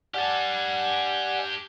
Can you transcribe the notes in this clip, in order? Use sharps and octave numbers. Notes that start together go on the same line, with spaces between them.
G4 D5 F#5 G#5 A5